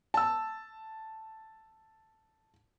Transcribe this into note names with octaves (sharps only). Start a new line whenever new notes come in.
A5 E6